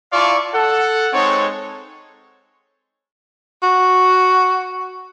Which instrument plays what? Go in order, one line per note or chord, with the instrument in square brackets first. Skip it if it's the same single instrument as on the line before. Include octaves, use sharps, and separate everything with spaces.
[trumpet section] E4 F4 D5 F5 A5 C#6
A4 F#5
G#3 C4 D#4 A4 C#5
[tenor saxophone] F#4